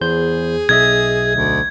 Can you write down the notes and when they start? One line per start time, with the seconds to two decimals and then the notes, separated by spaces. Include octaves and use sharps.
0.01 E2 G#4 C5 G6
0.69 B1 D#5 E5 G#6
1.35 D2